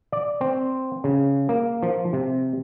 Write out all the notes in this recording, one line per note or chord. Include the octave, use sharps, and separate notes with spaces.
D5
C4
C#3
A#3
F3
C3